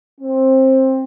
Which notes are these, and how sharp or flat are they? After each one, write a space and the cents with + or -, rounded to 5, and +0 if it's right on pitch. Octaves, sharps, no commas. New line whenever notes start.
C4 +15